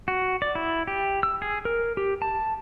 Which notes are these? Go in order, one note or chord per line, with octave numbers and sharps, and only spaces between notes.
F#4
D5
E4
G4
E6
G#4
A#4
G4
A5